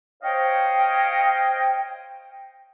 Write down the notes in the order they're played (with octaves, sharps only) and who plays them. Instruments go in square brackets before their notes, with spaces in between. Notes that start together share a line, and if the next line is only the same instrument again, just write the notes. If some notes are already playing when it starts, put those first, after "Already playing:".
[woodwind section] C5 C#5 D#5 F5 G5